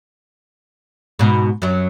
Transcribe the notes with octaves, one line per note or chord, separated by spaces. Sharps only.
G#2 B2
F#2 F#3